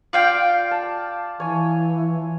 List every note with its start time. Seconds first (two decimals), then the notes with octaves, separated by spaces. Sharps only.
0.13 F4 D5 F5 G5
0.71 A5
1.40 E3 C#5 G#5